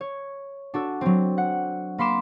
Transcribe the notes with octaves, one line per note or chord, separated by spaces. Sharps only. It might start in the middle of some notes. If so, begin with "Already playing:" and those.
C#5
D4 F#4 A4
F#3 C4
F#5
A#3 B5 C6 D6 E7